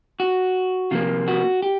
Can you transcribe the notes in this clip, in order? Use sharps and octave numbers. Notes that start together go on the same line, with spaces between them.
F#4
C3 F3 A#3 F4
F#4
G4